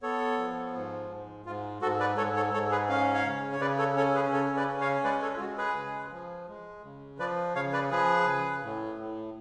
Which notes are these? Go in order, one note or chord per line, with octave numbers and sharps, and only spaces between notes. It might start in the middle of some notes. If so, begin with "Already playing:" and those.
B3 A4 C#5
F3
G#2
G#2
G#2 F4
G#2 F#4 A4
B4 D5
G#2 A4 C#5
A4 C#5
G#2 A4 C#5
G#4 B4
C#4 F5
C#5 F5
C#3
C#5
C#3 B4 D5
A4 C#5
C#4 A4 C#5
G#4 B4
C#3 A4 C#5
B4 D5
C#4
C#5 F5
G#3 B4 D5
A4 C#5
F4
G#3 F#4
G#4 B4
C#3
F3
G#3
C#3
F3 B4 D5
C#3 C#5 F5
B4 D5
F3 G#4 B4
C#3
A2
A2